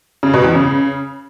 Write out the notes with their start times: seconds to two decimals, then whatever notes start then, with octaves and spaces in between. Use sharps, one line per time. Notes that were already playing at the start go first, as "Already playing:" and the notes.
0.23 C#3
0.34 B2
0.44 E2
0.55 C#3